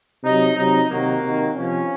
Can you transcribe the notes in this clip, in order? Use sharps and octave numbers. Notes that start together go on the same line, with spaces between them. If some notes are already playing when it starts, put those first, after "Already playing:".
C3 F#3 D#4
C3 F#3 D#4
C3 D#3 F#3 A#3
C3 D#3 F#3
C3 F3 C#4